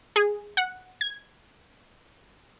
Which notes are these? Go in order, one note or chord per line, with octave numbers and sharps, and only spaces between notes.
G#4
F#5
G#6